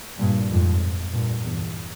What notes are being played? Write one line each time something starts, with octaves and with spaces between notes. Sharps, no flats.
G2 A#2
F2 G#2
G2 A#2
E2 G2